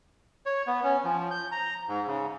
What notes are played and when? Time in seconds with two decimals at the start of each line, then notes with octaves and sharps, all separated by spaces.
0.46 C#5
0.67 B3
0.84 C#4
1.04 F3
1.31 G6
1.52 A#5
1.88 G#2
2.07 C#3